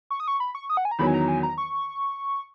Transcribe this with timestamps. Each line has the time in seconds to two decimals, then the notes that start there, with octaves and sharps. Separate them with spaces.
0.11 C#6
0.20 D#6
0.28 C#6
0.40 B5
0.55 C#6
0.70 D#6
0.77 F#5
0.85 G#5
0.91 A#5
0.99 E2 D#3 F#3 B5
1.07 G#5
1.14 A#5
1.28 G#5
1.43 A#5
1.58 C#6